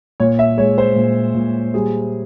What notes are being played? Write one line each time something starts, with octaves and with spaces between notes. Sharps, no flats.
A#2 C#5
E5
G#3 C#5
C5
A#2
A#2
G3 G#4